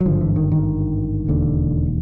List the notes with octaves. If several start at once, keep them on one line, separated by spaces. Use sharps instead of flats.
F#3
G#1 G2 D3 F3
E3
D#3
D#3
E1 D#2 D3